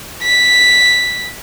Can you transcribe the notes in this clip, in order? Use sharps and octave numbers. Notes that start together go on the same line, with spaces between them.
B6